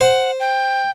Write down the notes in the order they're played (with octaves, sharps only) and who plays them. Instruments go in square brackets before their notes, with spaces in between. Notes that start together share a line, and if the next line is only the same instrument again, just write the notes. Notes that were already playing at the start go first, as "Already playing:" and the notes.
[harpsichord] C5 [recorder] F#5
[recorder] G5